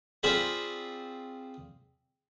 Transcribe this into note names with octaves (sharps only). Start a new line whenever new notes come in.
C4 F4 G#4 C5 D5 B5